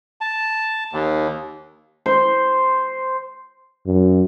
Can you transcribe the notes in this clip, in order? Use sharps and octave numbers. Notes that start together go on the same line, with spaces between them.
A5
D#2
C5
F#2